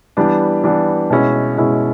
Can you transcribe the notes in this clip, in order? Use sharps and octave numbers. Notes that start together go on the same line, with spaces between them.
E3 G3 B3 D4
E3 G3 B3 D4
B2 G#3 C#4 E4
B2 G#3 C#4 E4